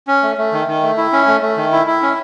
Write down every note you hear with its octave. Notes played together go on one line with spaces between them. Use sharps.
C#4
A3
A3
D#3
D#3
A3
E4
C#4
A3
A3
D#3
E4
E4
C#4